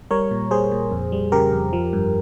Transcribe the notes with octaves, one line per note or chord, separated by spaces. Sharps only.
G3 A#4 C#5
A#2
G3 G#4 C5
A#2
F2
G3
C#3 G4 A#4
F2
F3
G2